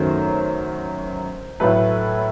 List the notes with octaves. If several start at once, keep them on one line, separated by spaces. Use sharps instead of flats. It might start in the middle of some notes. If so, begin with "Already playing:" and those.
Already playing: F#2 D#3 F#3 A3 A#4 C5
A2 F#3 A3 A4 B4